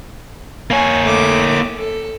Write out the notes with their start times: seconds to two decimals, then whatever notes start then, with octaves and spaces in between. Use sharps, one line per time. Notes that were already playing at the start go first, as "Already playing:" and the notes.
0.70 A#3 C#5 G#5
1.04 A3 D6
1.77 A4